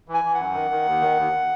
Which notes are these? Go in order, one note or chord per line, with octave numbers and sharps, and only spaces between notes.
E3
G#5
E3
F#2 F#5
D#3
D#3
D#2
D#3
D#2